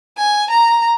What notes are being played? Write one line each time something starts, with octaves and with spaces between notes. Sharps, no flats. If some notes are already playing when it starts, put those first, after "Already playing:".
G#5
A#5